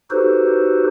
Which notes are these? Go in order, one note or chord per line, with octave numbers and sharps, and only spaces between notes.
D#4 F#4 G4 A4 B4 C5